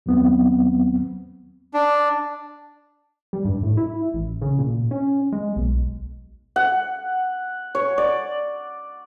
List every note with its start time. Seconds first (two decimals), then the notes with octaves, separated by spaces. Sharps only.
0.06 D#2 F#3 B3 C4
1.74 D4
3.33 G3
3.45 G2
3.63 A2
3.77 E4
4.14 A1
4.42 C#3
4.59 A#2
4.91 C#4
5.32 G#3
5.56 B1
6.56 F#5
7.75 C#5
7.98 D5